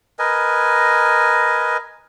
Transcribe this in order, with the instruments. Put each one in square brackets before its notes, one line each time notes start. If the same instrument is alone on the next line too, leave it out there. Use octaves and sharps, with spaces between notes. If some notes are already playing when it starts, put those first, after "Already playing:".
[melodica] A#4 B4 D#5 G#5